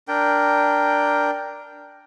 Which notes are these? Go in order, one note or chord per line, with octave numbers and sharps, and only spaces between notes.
D4 A#4 G5